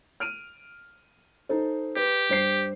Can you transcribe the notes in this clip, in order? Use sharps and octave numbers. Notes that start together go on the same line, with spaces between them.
F6 D7 D#7
D#4 A4 C5
G4 B4
G2 C5 C7